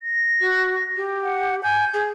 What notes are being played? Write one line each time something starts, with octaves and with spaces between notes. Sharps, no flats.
A#6
F#4
G4
F#5
G#5 G6
G#4